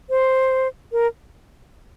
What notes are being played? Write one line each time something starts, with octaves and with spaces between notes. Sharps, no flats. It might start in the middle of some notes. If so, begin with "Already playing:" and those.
C5
A#4